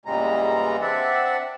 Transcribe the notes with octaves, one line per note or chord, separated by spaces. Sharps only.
E2 A#2 C#3 G3 G#3 A#5
C4 D4 D5 E5 F#5